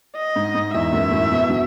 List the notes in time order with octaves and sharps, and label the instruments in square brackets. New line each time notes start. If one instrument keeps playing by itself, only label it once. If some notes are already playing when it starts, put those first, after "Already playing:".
[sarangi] D#5
[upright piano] G#2
G#2
[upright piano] E2 [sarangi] E5
[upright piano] F#2
A2
B2
F#3